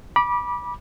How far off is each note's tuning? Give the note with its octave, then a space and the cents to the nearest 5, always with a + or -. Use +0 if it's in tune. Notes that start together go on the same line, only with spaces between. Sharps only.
B5 -25 D6 +0